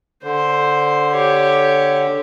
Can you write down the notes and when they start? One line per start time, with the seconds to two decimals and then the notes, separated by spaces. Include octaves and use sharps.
0.24 D3 C5
1.12 G4 C#5